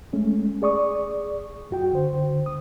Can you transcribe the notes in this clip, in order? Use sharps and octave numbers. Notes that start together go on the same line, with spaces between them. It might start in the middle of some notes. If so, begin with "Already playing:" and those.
G#3 A3 C#4
G#4 D5 C#6 D#6
F#2 F#4 G5
D3 C5
C#2 D#6